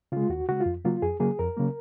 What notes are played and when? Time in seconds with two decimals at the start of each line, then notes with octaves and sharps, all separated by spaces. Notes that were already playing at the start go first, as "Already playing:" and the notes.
0.12 C#3 G#3 F4
0.30 D#2 F#4
0.49 C#3 G#3 F#4
0.61 F4
0.66 F2
0.84 C#3 F#3 A#3 F4
1.02 F2 G#4
1.20 C#3 F#3 A#3 G#4
1.39 F2 A#4
1.57 C#3 F#3 A#3